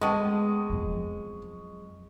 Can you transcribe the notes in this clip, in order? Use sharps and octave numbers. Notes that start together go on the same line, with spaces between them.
G#3 B3 D#5 G5 A5 C#6 D#6
F2 F#3